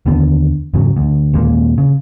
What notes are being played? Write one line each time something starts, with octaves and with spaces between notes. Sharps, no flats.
D#2 D3 B3
E2 G#2 C#3 F#3
D2
D#2 A#2 G#3 A#3
C#3